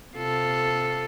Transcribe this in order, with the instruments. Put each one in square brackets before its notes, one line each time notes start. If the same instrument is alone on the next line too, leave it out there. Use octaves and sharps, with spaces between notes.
[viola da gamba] C3 F4 A4